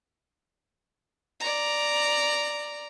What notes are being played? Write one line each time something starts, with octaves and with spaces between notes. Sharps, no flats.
D5 A#5